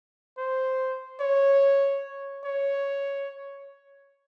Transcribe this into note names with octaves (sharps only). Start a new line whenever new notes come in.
C5
C#5
C#5